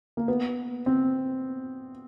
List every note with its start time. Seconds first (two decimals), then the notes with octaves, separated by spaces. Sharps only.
0.17 A#3
0.28 B3
0.86 C4